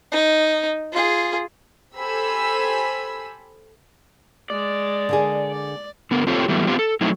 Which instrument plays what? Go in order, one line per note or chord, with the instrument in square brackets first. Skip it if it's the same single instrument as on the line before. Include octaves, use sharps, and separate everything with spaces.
[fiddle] D#4
F4 G#4
[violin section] G4 A4 C5 G#5 B5 E6
[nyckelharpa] G#3 [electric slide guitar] D5
[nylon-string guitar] D3 A#3 G#4
[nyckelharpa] D5
[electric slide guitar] D3 B3 A#4
C4 F4 G4 A4 C5 C#5
E3 F#3 G3 A3 B3
B3 C4 F4 G4
A4
F#3 A3 C4 D#4 E4